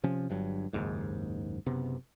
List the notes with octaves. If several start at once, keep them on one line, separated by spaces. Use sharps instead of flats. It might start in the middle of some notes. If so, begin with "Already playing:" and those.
C3 F3 C#4
G1 G2 F#3
F#1 D#2 G#2
F#1 C3 B3